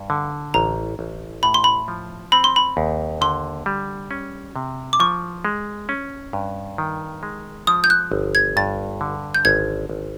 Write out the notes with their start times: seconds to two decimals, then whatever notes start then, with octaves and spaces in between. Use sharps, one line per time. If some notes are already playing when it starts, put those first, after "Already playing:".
Already playing: G2
0.10 D3
0.54 A1 A#5
0.99 A1
1.43 A2 B5
1.54 C6
1.64 B5
1.88 F3
2.32 C4 B5
2.44 C6
2.56 B5
2.77 D#2
3.21 D3 C6
3.66 G3
4.11 C#4
4.56 C3
4.93 D6
5.00 F3 C#6
5.45 G#3
5.89 C#4
6.33 G2
6.78 D#3
7.23 G#3
7.67 F3 D#6
7.84 G6
7.90 F#6
8.12 G1
8.35 G#6
8.57 G2 A6
9.01 D3
9.35 G6
9.45 G#1 G#6
9.90 G#1